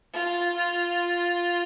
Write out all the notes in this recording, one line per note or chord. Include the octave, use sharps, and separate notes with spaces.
F4
F4